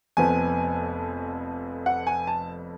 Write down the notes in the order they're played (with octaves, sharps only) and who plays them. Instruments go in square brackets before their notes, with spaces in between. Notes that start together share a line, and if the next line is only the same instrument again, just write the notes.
[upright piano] F1 F2 F3 B3 G#5
F#5
G#5
A5